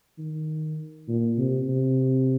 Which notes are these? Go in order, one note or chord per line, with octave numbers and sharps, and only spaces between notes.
D#3
A#2
C3
C3